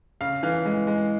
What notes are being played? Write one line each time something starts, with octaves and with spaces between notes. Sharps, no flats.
C#3 F5
E3 F5
G#3
G#3